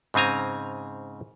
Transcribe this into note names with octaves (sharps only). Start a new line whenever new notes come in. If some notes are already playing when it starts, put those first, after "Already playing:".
G#2 C#3 C4 G#5 A#5